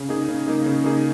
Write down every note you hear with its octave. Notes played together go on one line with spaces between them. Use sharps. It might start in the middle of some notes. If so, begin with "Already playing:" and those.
Already playing: C#3
A#3 D#4 G#4
C#3
A#3 D#4 G#4
C#3
A#3 D#4 G#4